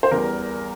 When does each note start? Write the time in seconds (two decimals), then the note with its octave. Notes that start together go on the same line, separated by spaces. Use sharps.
0.03 C5
0.11 E2 E3 G3 A#4